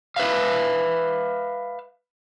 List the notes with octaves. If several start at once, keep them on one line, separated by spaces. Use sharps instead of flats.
B4 E5 F5